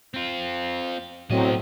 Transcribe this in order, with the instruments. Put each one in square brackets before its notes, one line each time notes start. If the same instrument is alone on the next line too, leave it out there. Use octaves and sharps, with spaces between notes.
[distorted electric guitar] C4 F4
[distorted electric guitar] B1 D#5 [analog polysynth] A2 F#3 C4